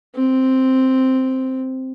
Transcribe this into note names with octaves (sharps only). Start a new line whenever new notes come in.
C4